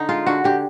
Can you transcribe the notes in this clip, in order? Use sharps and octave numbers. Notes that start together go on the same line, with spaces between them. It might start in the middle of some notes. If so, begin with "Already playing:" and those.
Already playing: D3 D#4
G#3 F4
D3 F#4
D3 G4